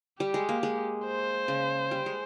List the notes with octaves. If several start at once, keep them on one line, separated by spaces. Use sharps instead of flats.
G3 G4
G#3
A#3
G#3
C5
C#3
G3
G#3